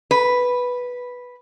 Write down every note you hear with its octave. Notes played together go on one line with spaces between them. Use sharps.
B4